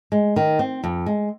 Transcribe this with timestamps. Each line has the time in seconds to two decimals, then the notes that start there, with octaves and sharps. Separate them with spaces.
0.12 G#3
0.36 D#3
0.59 C4
0.84 F2
1.06 G#3